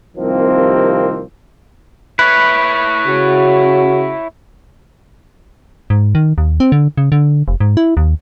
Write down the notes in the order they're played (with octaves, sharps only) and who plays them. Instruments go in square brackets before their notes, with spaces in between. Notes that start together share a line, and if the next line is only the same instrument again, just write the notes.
[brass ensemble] C2 C3 D#3 F3 A#3 C4
[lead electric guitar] E4 C#5 [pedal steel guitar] B4
[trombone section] C#3 C#4 F#4
[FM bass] G#2
D#3
D#2
C4
D3
C#3
D3
F1
G#2
E4
D#2